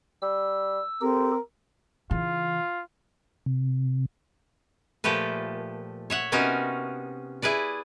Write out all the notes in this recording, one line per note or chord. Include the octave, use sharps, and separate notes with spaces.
G3 E6
C4 G4 A4 A#4
C#3 E3 F4
C3
A#2 F3 A3 G4 A4 B4
C#5 E5 F#5
C3 B3 C#4 D#4 F#4 A#4
E4 G#4 B4 D5